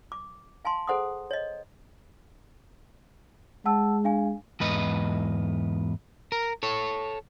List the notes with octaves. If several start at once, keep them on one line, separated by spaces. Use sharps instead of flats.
D6
F5 G#5 A5 C6
G#4 A4 C5 F#5 C6 D#6
C#5 D#5
G#3 F#5 A5 E6
D4 F5 G#5
E2 G#2 B4 D#5
A#4
A4 C#5